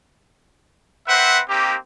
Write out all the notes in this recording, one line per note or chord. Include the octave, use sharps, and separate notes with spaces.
C4 B4 C5 E5 F#5
A#3 C4 D#4 G4